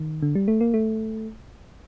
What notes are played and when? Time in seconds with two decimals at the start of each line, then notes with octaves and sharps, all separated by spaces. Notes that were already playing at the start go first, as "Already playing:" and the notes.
Already playing: D#3
0.22 D3
0.35 G3
0.48 A3
0.61 A#3
0.74 A3